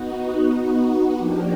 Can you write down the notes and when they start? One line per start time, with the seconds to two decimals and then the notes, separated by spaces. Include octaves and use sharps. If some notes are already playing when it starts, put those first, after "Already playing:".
Already playing: B3 D#4 F#4
1.14 F3 A#3 D4 G4